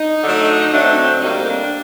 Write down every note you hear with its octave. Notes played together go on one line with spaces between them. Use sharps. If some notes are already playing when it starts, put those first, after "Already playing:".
Already playing: D#4
D3 F#3 A3
D3 F#3 A3 D4
C4
C4
A2 G3 A#3 D#4
D4
C4
D4